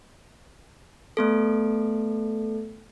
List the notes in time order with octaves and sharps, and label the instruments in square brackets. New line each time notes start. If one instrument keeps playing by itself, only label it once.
[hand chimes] A3 B3 A4